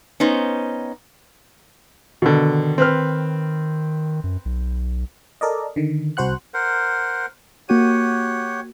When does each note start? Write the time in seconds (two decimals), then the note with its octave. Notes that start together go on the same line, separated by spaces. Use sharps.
0.20 B3 C#4 D#4 C5
2.22 B2 D3 D#3
2.78 C4 B4 F6
4.24 F#2
4.45 B1
5.41 A4 A#4 D5 D#5
5.76 D3 D#3
6.17 C2 F#4 C5 F#5 F#6
6.54 A#4 C5 F#5
7.69 A#3 F#4 G4 C#5 F#5 D#7